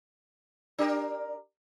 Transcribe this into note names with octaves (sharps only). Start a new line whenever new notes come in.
D4 G4 A#4